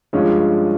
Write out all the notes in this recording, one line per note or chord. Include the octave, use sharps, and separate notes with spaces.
G2 F3 G#3 C#4